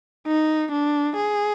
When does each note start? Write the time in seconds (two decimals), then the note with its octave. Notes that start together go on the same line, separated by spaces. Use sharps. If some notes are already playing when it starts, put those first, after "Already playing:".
0.27 D#4
0.72 D4
1.17 G#4